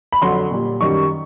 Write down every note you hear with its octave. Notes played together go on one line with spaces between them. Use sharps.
B5
F2 D3 F#3 C6
A#2 G3
F#2 D#3 G3 C#6